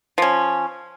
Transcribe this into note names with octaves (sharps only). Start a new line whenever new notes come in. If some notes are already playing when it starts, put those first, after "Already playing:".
F3 C#4